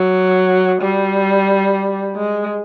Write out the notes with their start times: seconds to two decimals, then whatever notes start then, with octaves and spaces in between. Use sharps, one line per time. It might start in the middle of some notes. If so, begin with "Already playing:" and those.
Already playing: F#3
0.81 G3
2.16 G#3